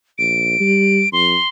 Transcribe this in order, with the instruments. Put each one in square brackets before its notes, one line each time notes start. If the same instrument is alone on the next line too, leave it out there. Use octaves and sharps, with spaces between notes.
[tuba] A#1 [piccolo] D7
[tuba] G3
[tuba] F2 [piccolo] C6